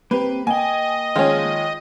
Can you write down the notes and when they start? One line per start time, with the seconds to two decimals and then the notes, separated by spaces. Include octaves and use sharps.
0.11 A#3 C4 G4 B4
0.47 A#3 D#5 G5 G#5
1.16 D#3 F3 G#3 C#4 F4